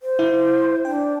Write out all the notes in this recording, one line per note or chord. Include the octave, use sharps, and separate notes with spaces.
C5
E4
D4 G5